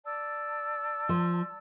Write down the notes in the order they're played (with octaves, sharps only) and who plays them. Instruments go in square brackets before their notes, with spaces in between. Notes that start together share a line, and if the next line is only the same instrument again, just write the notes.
[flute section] D5 A5 E6
[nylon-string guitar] F3